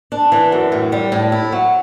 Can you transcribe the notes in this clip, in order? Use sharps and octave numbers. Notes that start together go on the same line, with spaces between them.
D4
E3
F#2
A2
G3
A2
E4
F#3